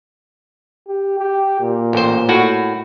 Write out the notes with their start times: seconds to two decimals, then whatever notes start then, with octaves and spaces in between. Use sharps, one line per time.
0.88 G4
1.18 G4
1.61 A#2
1.93 A1 C5
2.29 A2 F#4